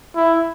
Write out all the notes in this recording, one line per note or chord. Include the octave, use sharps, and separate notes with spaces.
E4